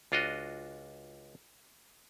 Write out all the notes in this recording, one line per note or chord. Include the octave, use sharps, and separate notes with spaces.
C#2 D4 F4 F#4 D#5